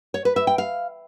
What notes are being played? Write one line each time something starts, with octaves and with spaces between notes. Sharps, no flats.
C#5
B4
E5
G5
F5